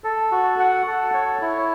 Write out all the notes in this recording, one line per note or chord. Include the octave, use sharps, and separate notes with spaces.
A4
F#4
F#5
A4
C#5
E4